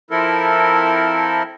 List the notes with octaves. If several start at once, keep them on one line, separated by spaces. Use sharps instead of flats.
F3 C4 E4 A4 A#4